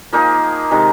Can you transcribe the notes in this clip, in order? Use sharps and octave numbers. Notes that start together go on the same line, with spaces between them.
F3 A#3 D#4 G#4
C3 D#3 G#3